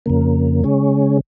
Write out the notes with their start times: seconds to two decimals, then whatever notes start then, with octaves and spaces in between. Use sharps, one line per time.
0.06 F2 C#3 A#3
0.64 C#3 G#3 C#4